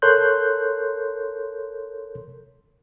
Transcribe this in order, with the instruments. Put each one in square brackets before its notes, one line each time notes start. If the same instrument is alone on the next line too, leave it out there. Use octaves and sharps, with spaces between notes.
[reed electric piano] A4 A#4 C#5 C6 F#6 G6